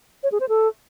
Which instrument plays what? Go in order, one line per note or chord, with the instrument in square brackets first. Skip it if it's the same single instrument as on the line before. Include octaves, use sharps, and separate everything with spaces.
[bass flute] C#5
G#4
C5
A4